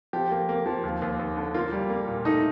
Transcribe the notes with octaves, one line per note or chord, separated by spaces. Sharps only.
F3 G4
A#3
A#3
F3
D#2
D#2
D#2
D3
A#3 F4
G3
A#3
A#2
A3 D#4